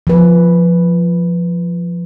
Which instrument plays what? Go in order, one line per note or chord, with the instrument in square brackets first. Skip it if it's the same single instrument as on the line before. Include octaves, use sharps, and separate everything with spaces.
[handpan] F3 B4